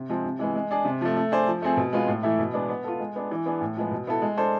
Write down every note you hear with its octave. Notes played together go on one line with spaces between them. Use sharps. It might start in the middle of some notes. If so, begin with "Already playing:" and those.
Already playing: C3
F3 G#3 C4
C3
E3 G#3 B3
G#3
D4 G#4
C3
F3 A3
A3
D4 G#4 C5
F3
A3 C4 G#4
B2
G#3 B3 F4 G#4
A2
E3 A3 E4
B2
G#3 B3 D4
B3
F4 A4
G#3
B3 D4 G#4
E3
B3 D4 G#4
A2
F3 G#3 B3
B2
B3 E4 A4
G#3
D4 A4 C5